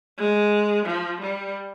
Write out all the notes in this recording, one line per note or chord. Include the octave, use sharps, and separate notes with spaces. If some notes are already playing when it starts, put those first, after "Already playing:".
G#3
F3
G3